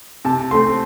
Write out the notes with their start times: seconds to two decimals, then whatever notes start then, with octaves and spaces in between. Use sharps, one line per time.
0.25 C3 A5
0.51 A3 C4 C6